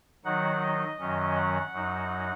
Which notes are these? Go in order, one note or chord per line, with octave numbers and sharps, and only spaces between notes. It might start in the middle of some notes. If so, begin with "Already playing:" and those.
D#3 F#3 D#4 F#5
D#5
F#2 D#3 F#3 C#4
F#5
F#2 F#3 D#4